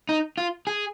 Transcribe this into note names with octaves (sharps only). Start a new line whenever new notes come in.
D#4
F4
G#4